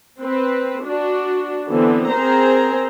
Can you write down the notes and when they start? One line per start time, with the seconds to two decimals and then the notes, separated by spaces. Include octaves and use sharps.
0.22 C4 B4
0.85 D4 F#4
1.69 D3 E3 B3 C4
2.12 C4 G#4 A#4 C5 A#5